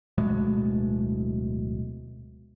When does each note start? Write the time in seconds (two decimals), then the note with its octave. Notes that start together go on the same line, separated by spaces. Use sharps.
0.18 D1 B2 G#3 A3